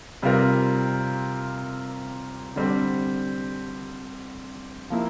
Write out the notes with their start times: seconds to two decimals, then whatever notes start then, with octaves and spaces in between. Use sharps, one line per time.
0.22 C3 G3 C4 F4 A#4
2.56 D3 G3 C4
4.90 F3 A#3 E4